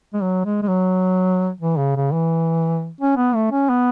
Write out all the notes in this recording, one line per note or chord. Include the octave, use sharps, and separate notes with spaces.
G#3
F#3
G#3
G#3
F#3
E3
C#3
C#3
E3
C#4
B3
A3
C#4
B3